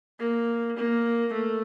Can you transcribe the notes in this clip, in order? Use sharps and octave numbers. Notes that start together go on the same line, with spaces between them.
A#3
A#3
A3